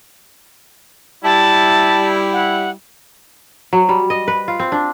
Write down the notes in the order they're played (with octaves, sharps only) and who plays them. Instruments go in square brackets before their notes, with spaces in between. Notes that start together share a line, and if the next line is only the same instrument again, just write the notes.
[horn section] G3 E4 [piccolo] A5
[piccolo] F#5
[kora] F#3
G3
D#5
B4
F4
C4
D4